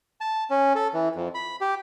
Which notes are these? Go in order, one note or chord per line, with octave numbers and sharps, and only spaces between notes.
A5
C#4
A4
E3
F2
B5
G4